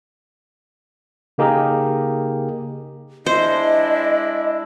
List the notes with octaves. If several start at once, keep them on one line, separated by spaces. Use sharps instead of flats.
C#3 A#3 D#4 G4 G#4 A#4
G#3 D4 E4 C5 D#5